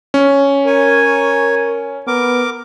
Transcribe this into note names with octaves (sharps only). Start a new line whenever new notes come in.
C#4
A#4 C#5 G#5
B3 A#4 D6